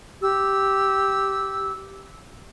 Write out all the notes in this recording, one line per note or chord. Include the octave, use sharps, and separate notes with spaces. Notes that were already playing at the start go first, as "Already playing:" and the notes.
G4 E6